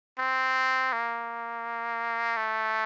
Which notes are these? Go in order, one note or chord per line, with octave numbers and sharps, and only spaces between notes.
C4
A#3
A3